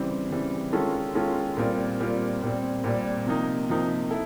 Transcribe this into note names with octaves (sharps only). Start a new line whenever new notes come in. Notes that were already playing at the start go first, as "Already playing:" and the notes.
Already playing: C#3 E3 G3 C4
C#3 E3 G3 C4
D#3 G#3 C#4 F4 A4
D#3 G#3 C#4 F4 A4
A#2 G3 C4 F4 A#4
A#2 G3 C4 F4 A#4
A#2 G3 C4
A#2 G3 C4
C3 F3 A#3 D#4
C3 F3 A#3 D#4
E4 A4